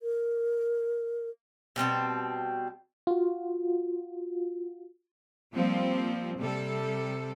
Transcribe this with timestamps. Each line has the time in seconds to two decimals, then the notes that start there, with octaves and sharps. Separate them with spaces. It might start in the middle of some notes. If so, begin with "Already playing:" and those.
0.01 A#4
1.76 B2 G3 C4 A5
3.07 F4 F#4
5.53 F3 G3 A#3 C4
6.38 C3 G3 A4